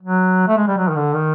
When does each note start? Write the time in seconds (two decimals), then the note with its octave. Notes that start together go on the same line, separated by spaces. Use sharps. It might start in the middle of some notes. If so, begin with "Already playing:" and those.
0.02 F#3
0.48 A3
0.57 G#3
0.67 G3
0.77 F#3
0.89 D#3
0.96 D3
1.14 D#3